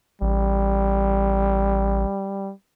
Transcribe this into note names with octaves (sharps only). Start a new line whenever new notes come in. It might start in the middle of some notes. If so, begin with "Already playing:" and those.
A1 G3